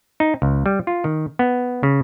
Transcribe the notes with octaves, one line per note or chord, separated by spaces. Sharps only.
D#4
C#2
G3
F4
D#3
B3
C#3